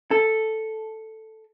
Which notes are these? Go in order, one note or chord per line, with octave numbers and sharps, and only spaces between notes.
A4